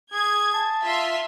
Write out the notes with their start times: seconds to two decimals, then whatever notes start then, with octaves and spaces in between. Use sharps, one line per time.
0.14 G#4 G#6
0.54 A5
0.84 F4 E5 C6